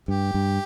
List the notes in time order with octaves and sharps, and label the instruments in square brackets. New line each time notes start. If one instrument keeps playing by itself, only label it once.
[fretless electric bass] G2 [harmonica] G4
[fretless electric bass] G2